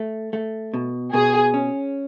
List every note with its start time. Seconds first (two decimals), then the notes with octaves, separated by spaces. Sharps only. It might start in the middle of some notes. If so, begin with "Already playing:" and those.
Already playing: A3
0.33 A3
0.74 B2
1.13 B2 G#4
1.54 C#4